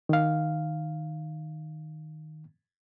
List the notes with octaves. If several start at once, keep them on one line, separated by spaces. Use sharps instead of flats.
D#3 F5